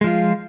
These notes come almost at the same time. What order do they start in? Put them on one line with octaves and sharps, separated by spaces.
G#3 F3 F4